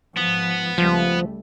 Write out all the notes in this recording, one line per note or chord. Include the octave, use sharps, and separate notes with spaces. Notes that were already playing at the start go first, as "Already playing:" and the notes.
G#2 F3 B3
C#2 F3 G3 A3